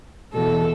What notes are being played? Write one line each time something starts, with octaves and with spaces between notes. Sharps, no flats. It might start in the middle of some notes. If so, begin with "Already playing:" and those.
E2 B2 A4